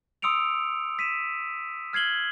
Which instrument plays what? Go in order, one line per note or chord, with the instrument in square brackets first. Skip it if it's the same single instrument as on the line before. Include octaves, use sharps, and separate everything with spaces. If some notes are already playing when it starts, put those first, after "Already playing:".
[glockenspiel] C6 D#6 E6 C#7 D7 F7
B6 D#7 E7
F6 G#6 C7 F#7 G7